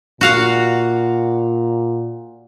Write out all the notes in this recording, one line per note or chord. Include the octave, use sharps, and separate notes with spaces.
A#2 F#4 F5 F#5